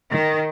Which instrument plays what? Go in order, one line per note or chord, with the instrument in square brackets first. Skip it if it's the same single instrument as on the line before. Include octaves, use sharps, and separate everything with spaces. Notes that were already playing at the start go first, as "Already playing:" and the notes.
[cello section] D#3